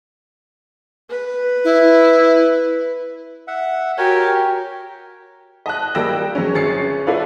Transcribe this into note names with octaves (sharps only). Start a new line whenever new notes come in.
B4
E4
E5 F#5
F#4 G4 A#4 C#5 G#5
D#5 A5 F#6
G3 A#3 G5 E6 A#6 E7
F#3 G#3 C#4
G1 C#4 G#4 A6 C7 C#7
E4 F4 A4 B4 D5 F5